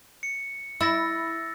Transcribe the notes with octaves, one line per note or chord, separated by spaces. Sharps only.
C#7
E4 E6 A6 A#6